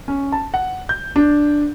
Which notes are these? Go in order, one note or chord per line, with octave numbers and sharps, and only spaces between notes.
C#4
A5
F#5
G6
D4